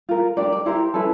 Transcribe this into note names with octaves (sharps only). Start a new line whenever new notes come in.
F4 A#4
D4 G4 A#4 D5
D5
E4 G4 A#4 C5
C#4 E4 A4 B4